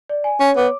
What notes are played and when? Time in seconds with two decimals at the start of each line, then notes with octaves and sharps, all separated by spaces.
0.09 D5
0.24 G#5
0.40 C#4 C#5
0.56 B3 D6